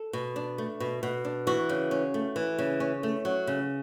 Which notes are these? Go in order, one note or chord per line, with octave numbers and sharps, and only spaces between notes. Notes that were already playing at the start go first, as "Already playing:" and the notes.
Already playing: A4
B2
D4
A3
B2
B2
D4
E3 F#4
C#3
C#4
A3
E3
C#3
C#4
A3
F#3
C#3